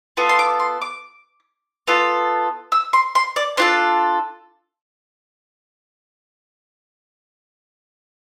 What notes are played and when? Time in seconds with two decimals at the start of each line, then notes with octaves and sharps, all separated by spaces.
0.17 B3 F4 A4
0.29 C6
0.39 D6
0.60 C6
0.81 D6
1.87 B3 F4 A4
2.72 E6
2.93 C6
3.15 C6
3.36 D5
3.57 D4 F4 A4 C5